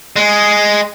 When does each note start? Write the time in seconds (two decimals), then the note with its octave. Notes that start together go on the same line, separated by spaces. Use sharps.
0.16 G#3